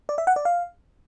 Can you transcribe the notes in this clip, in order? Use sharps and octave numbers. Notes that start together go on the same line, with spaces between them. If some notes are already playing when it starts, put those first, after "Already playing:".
D5
E5
F#5
D5
F5